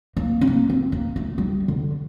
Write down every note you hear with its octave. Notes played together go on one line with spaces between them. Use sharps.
A#3
C4
A#3
C4
A#3
A3
G3
D3